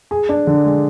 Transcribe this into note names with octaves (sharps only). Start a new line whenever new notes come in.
G#4
D4
D3
G#3